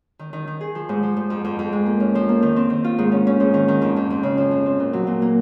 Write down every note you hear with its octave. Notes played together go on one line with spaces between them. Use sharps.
D#3
D#3
D#3
G#4
F3
G#2
F3
G#2
F2
F2
F2
G#3
A#3
C#4
F3
A#3
D#3
C4
D#3
F4
G#2
C#4
C#4
G#2
D#3
D#3
F2
F2
F2
C#3
F3
F2
C4
A#2
F#3
A#2
A#3